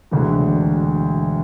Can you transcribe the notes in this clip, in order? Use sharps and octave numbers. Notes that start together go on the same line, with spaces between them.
E1 D2 D3